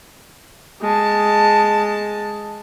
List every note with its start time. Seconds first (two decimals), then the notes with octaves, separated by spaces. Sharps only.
0.81 G#3 A5